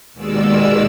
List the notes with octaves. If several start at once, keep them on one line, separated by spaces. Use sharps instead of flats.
D#2 B2 D#3 G#3 D5 E6